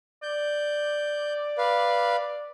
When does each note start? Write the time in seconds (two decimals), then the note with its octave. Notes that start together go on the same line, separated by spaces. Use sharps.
0.23 D5 G6
1.58 B4 F5